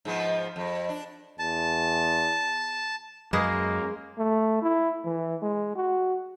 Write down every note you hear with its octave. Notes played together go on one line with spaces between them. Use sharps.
G#2 F3 B3
F2
D4
E2 A5
F#2 G#3 A#3 G#4 B4 D#5
A3
E4
E3
G#3
F#4